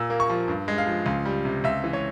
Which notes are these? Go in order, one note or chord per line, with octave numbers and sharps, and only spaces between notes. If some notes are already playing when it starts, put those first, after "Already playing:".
Already playing: A#2 E6
A#3
C#6
F3
G2
G#3
F5
F3
C#2
G3
C3
C#2 E5
E3
C#5